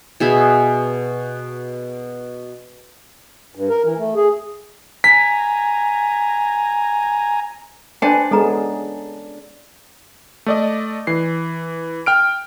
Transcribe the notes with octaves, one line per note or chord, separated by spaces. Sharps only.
B2 G#4 E5 B5
G2
A#4
E3
A3
G#4
G#5 A#5 B6
D4 B4 C5 G5 G#5
G#3 B3 C#4 G#4 A4 D#5 A#5
A3 D5 D#5
E3 C7
G5 F6 D7